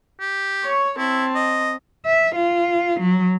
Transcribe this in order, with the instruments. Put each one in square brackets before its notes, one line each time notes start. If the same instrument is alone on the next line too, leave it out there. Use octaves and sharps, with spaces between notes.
[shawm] G4
[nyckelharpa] C#5 C#6
[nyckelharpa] C4 A5 [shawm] E4
[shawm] D#5
[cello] E5
F4
F#3